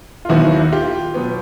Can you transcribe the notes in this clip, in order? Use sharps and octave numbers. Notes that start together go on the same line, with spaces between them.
F4
D#2 D#3 F#3 B3 E4 F#4
F4 G4
B2 F#3 B3